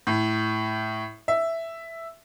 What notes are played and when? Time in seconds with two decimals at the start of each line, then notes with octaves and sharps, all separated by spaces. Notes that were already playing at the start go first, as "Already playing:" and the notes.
0.07 A2
1.28 E5